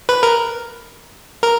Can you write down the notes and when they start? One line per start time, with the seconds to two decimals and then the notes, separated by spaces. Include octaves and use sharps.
0.09 B4
0.23 A#4
1.42 A#4